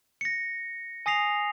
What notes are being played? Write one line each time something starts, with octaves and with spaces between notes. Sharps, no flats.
A#6 C#7
G#5 D#6 A#6 C7 F7